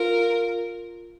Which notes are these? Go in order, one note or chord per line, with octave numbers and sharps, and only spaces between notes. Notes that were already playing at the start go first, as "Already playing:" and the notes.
Already playing: F4 A#4